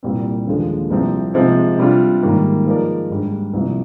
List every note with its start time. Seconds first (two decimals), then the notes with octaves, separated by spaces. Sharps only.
0.03 C2 A#2 G3 C4
0.47 D#2 D3 F3 G#3 D4
0.90 C2 C3 F3 C4
1.34 C3 F3 G#3 C4 D#4
1.78 C3 G3 D4 F4
2.23 G#2 D#3 G3 A#3
2.66 F3 G#3 D#4 A#4 D5
3.10 G#2 G3 D4
3.53 C2 C3 F3